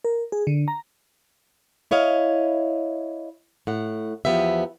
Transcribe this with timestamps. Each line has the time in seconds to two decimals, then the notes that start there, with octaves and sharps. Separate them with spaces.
0.04 A#4
0.32 G#4
0.47 D3
0.68 A#5
1.91 E4 C#5 D#5 F5
3.67 A2 F#5
4.25 E2 F3 B3 G4 E5